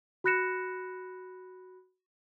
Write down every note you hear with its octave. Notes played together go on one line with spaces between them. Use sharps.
F#4 B5 F#6 A#6 C#7 E7